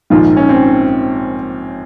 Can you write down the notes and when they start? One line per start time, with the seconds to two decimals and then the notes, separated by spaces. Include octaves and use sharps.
0.10 A#1 G#2 D#3 F4
0.37 C#4
0.49 C4